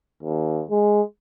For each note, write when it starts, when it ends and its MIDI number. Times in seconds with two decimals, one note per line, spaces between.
0.23 0.62 39
0.70 1.02 56